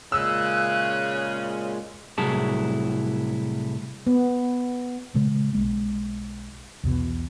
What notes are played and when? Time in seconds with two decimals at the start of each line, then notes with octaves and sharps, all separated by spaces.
0.12 A#2 C#3 G#3 E6 F#6
2.18 C2 A2 F#3 E4 G#4 A5
4.07 B3
5.14 A#2 C#3 G#3
5.53 B1 G#3 A#3
6.83 B1 E2 B2